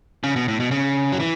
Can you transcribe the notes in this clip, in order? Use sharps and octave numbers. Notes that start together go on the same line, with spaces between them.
C#3
B2
A2
B2
C#3
F#3
E3